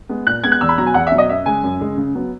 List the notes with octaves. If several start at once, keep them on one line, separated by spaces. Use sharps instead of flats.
G#3 B3
A#2 F#6
G#3 B3 G#6
F#6
E2 E6
B5
B2 F#3 A#5
G#5
E2 F#5
E5
B2 F#3
D#5
F#2 E5
C#3 G#3 G#5
F#2
C#3 G#3
C#3
F#3 B3